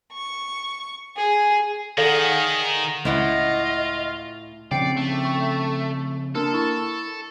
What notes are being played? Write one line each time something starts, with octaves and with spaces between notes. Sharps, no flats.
C#6
G#4
D#3 G#4 A4 D5 F5 F#5
C#2 A2 E4 F4 D#5 F#5
C#3 F3 C4 D5 G5 C7 C#7
A3
C#6
A#3 D4 A4 A#4
E4 C#6